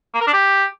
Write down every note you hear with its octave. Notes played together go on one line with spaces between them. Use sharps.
A#3
A#4
D4
G4